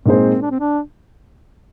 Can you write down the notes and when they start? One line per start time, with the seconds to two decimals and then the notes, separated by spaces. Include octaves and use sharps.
0.06 A#2 G#3 C4 D#4 G#4 C5
0.41 D4
0.51 C4
0.60 D4